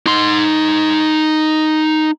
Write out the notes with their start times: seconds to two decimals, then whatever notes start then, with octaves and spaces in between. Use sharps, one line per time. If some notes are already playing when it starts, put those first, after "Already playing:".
0.06 D#4 C6